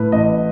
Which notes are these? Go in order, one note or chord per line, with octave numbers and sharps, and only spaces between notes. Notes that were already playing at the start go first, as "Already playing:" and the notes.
Already playing: A2 B4
A1 D#5